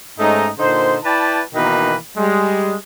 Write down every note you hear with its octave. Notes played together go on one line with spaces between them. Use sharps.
G#2 A3 C#4 D#4
A#2 D3 D#4 C5
E4 B4 D5 G5 A5
B2 D#3 E3 A#3 D#4 B4
G3 G#3